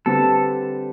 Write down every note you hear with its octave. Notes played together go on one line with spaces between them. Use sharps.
D3 G3 C4 G4 A4 B4